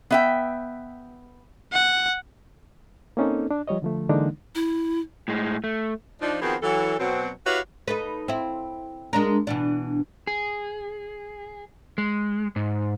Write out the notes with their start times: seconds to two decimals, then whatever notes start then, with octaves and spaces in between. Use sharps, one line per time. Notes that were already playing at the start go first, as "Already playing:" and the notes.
0.11 B3 E5 G5
1.73 F#5
3.17 A#3 C4 C#4 D#4 A4
3.51 D4
3.67 F3 G3 C#5 D#5
3.82 D3 F3 A3
4.09 D3 E3 G#3 A#3 D4 D#4
4.55 E4
5.28 A2 G#3
5.64 A3
6.22 F3 D4 D#4
6.42 D#3 F3 B3 C4 F#4 G#4
6.63 E3 F#3 A4
6.99 B2 F#3 C4
7.46 E4 F#4 G4 B4 C#5 F5
7.88 D#4 A4 B4
8.28 C4 E4
9.13 G#3 D4 A#4
9.47 B2 E3 D4
10.27 G#4
11.98 G#3
12.56 G#2